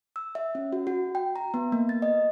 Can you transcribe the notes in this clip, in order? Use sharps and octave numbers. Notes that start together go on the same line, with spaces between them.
E6
E5
C#4
F#4
F#4
G5
A#5
B3
A#3
A6
D#5